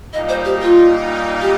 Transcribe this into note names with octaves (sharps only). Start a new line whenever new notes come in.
A#2 G3 A#3 D#4 D#5
C5
G4
F4
G4